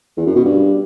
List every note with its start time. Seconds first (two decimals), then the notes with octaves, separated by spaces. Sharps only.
0.17 E2
0.26 F#2
0.36 B2
0.45 G2